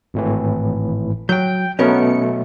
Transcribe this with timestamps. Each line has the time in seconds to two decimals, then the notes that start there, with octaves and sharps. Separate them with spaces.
0.14 G#1 A2 E3
1.29 F#3 G5 G6
1.79 B2 F#3 A3 B3 C#4 A#4 C#7